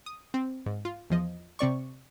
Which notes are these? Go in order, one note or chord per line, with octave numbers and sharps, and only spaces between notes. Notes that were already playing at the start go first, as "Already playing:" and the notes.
D#6
C4
G#2
F4
E2 F3 D#5
C3 C4 D5 C#6